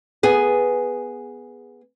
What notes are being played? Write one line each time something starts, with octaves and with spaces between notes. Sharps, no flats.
B3 G#4